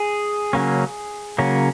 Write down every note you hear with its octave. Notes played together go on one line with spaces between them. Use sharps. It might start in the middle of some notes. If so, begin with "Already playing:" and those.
Already playing: G#4
C#3 F#3 A#3 C#4
C#3 F#3 A#3 C#4